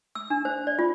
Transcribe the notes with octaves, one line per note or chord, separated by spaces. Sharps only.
E6
D4
C5
D5
F4